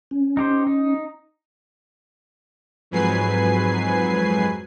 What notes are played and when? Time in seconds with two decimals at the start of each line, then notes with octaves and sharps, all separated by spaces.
0.11 C#4
0.37 D#4 G4 C5
0.67 D#4
2.91 F2 G#2 F#3 B4 G#5 C7